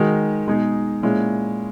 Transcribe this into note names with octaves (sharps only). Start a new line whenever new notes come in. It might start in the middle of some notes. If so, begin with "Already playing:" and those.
Already playing: D#3 G#3 D#4 F#4
B2 G#3 D#4 G#4
A#2 G#3 C#4 E4